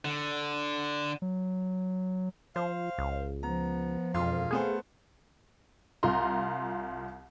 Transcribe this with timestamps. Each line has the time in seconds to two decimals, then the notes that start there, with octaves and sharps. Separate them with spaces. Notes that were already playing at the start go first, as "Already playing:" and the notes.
0.05 D3
1.22 F#3
2.56 F3 C5 F5
2.98 C#2
3.43 F3 B3 A#5
4.14 E1 F2 F4 F5 C6
4.51 A3 B3 G#4 C5
6.03 C2 F4 A#5 C6